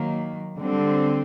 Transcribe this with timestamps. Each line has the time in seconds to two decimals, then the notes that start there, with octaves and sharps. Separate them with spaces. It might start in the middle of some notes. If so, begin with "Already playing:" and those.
Already playing: D#3 F#3 A#3
0.57 D3 G3 C4